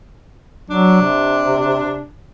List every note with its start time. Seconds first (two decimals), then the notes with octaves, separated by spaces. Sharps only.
0.70 F#3 D4
1.02 C3